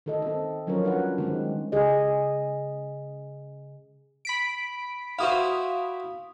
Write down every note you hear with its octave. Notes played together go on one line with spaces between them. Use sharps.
D#3 A4 D#5
C4 A4
F3 F#3 C#4 F4 A#4 C#5
G3 D4 B4 F#5
D#3 G#3 C4
C#3 G#4 D#5
B5 B6 D7
E4 F#4 C5 F5 D#6